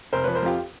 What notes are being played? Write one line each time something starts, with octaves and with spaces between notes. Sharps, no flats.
F1 A#4 C5
F3 B4 C#5
A#4 C5
F2 F4 G4